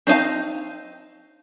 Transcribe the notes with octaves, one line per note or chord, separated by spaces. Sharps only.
C4 D4 D#4 F5 A5